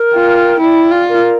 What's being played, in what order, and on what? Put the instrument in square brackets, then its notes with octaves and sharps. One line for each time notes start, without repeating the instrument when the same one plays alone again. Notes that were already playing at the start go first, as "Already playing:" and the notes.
Already playing: [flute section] A#4
[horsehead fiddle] F4 [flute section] G5
[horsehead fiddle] E4 [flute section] D5
[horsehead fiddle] F4
[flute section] A#4